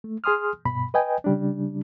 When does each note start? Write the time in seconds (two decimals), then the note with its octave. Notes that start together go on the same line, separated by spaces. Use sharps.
0.04 A3
0.24 G#4 G#5 C6 D#6 F6
0.65 G2 B2 B5
0.94 B4 D#5 G5 G#5
1.24 C#3 G3 D4